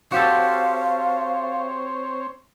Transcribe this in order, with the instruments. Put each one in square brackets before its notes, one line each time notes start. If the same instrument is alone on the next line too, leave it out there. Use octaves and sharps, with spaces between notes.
[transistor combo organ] C4 C5 C#5 [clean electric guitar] F#4 G4 A4 [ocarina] F5